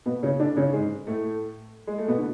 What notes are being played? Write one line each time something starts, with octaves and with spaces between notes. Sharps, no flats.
B2 B3
C#3 C#4
D3 D4
C#3 C#4
G#2 G#3
A2 A3
G#3
A3
B2 B3
D3